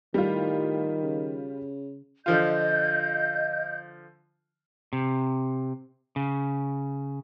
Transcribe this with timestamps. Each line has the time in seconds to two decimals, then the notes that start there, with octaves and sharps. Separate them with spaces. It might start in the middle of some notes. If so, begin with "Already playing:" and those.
0.14 A2 D#3 G3 F4
1.03 C#3
2.26 D3 F3 F4 D#5 G6
4.93 C3
6.16 C#3